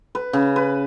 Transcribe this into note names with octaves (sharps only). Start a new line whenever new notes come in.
B4
C#3
B4